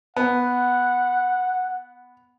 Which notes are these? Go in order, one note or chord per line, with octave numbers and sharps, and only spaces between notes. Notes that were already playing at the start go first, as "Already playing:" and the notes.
B3 F#5